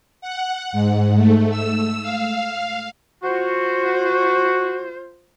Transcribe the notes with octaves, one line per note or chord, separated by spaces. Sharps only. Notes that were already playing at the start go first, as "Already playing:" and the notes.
F#5
G#2
A3
E6
F5
F4 F#4 C5